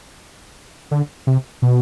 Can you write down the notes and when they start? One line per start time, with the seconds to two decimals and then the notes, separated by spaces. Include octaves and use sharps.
0.91 D3
1.27 C3
1.62 B2